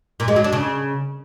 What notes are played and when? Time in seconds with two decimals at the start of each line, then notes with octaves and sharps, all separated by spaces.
0.20 A#2
0.28 G#3
0.36 F#3
0.44 D4
0.53 C#3